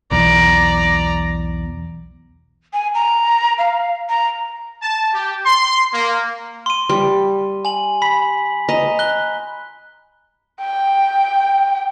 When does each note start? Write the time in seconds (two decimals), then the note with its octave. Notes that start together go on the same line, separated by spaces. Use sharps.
0.11 B1 E2 D5 A#5
2.73 G#5
2.95 A#5
3.58 F5
4.09 A#5
4.83 A5
5.14 G4
5.45 C6
5.93 A#3
6.66 C6 D#7
6.90 G3 C6
7.65 G#5 F#7
8.02 B5 B6
8.69 D#5 A#5
8.99 F#6 G7
10.61 G5